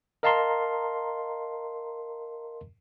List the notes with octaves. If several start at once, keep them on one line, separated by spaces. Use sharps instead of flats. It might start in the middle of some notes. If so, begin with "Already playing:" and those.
A#4 D#5 F5 A5 A#5 C6